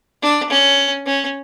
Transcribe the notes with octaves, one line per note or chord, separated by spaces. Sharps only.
D4
C#4
C#4